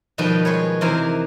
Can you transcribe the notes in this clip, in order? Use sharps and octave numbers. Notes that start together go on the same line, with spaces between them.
B2 D#3 F3 G3 B4 G5
G#3 B4 C#5
E2 C3 E3 A#4 C5